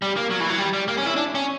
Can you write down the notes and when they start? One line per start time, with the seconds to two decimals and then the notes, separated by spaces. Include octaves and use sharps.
0.02 G3
0.16 A#3
0.30 F#3
0.40 E3
0.50 F#3
0.59 G3
0.73 G3
0.88 A#3
0.97 C#4
1.06 E4
1.16 D4
1.35 C#4